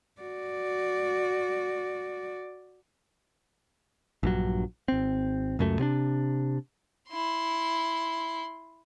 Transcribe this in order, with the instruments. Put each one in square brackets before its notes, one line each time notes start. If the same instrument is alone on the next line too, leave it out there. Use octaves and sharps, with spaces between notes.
[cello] F#4 D5
[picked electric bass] A#1 G2 F#3
G#1 C4
C#2 F#2 A3
C3 C4 D4
[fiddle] E4 C6